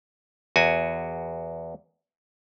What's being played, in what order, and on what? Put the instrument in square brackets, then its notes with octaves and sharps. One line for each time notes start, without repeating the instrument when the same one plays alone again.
[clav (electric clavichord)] E2 F#4 G#5